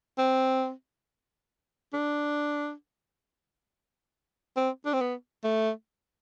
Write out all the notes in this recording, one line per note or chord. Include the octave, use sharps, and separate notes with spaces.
C4
D4
C4
D4
C4
B3
A3